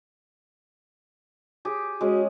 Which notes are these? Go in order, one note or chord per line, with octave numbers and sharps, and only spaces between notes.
G4 G#4
G#3 C#4 F#4